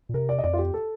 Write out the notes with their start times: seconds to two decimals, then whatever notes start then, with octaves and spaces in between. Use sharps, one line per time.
0.09 A#2
0.14 C3 A#4
0.29 D5
0.39 D#5
0.44 F2 D5
0.53 F4
0.59 G4
0.74 A4